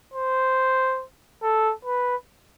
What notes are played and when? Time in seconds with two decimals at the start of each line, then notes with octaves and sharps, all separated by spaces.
0.14 C5
1.42 A4
1.85 B4